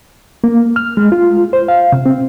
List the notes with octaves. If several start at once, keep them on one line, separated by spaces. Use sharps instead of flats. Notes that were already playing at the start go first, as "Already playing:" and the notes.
A#3
F6
G#3
F4
C5
F5
C3
C4